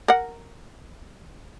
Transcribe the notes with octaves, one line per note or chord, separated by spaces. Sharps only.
A#4 F#5